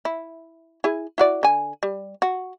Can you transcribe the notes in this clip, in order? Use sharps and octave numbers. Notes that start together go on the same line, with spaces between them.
E4
E4 G#4
E4 F#4 D5
D3 G#5
G3
F#4